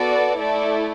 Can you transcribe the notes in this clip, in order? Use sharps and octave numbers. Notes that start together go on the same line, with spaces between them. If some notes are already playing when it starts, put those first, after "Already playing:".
Already playing: B3 F#4 A4 D5
A3 E4 A4 D5